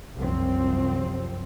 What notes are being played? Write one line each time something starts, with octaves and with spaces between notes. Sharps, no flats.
C2 F#2 F3 C4